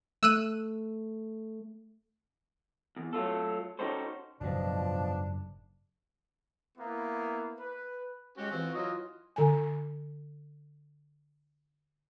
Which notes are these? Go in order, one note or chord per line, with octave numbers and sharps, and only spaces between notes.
A3 E6 F#6 D#7
E2
F#3 A3 F4 A4
C#4 D#4 F#4 G4 A4 C5
F#1 G#2 B2 F3 D4
A#3 B3 E4
B4
G#3 C#4 F#4 G4
E3 C4 F4
E3 F#3 F4 D#5
D3 G#5